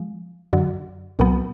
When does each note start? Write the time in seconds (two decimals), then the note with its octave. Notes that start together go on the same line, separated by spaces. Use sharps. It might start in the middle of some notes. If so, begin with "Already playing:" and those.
Already playing: F3 G#3
0.53 F#2 D3 F#3
1.19 C2 A#2 F#3 B3